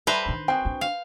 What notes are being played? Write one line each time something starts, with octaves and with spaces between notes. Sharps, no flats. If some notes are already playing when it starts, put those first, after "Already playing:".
G3 A4 B4 C5 E5 A#5
D#3 D4
C4 F#4 G#4 G5
D4
F5